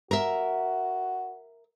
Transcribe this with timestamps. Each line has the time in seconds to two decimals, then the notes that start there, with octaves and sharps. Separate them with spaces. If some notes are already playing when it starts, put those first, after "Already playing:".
0.11 F#4 A#4 E5